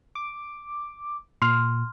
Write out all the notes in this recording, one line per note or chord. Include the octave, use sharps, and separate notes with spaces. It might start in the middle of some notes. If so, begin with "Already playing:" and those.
D6
A#2 C6 F6